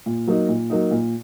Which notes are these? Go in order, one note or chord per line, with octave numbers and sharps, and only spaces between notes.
A#2
F#3 A#3 D#4
A#2
F#3 A#3 D#4
A#2